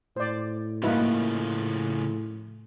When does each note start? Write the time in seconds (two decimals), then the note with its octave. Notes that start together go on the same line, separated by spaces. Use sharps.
0.17 A2 C5 D5
0.83 C#3 F3 A#3 D#4 E4 F#4 B4